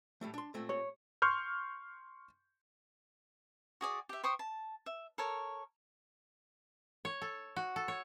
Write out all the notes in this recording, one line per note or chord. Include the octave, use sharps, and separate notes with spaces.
A2 G3 A3
D4 C6
A#2 A3 C4
C#5
C6 C#6 F6 G6
F#4 G#4 D5
G4 E5
C5 G5 C#6 D#6
A5
E5
A4 A#4 C#5
C#5
A4
F#4
A4
C#5